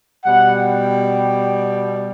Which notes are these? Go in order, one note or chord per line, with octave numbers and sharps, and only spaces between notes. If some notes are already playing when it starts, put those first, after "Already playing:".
B2 G3 F#5
G5